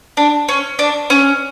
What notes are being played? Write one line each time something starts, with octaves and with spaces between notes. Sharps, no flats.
D4
C#4
D4
C#4